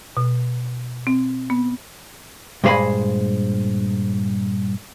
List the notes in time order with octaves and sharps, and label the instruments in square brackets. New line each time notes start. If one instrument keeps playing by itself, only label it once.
[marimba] B2
C4
B3
[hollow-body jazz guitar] G2 A#2 G#3 C5 G#5 B5